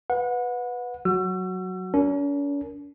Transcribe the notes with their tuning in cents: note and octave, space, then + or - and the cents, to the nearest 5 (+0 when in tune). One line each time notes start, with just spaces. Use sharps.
B4 +0 F#5 -30
F#3 +0 F#4 +0 E6 +35
C#4 +45 A#4 +0